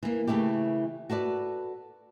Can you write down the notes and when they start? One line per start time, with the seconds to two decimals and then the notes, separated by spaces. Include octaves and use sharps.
0.03 E3 A#3
0.27 C#3 E3 A3 E4 G4
1.10 F#4 A4 B4 D5